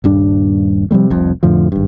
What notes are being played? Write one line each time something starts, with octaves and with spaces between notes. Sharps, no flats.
D#1 G2 D4
C3 F3 G3 A3
F1 C2 F2
F2 A2 D3 F3
G#1 G2